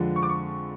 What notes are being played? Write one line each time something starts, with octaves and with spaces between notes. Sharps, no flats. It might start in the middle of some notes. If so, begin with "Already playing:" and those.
Already playing: F2 D3 F3 G#3
C#6
D6
C#6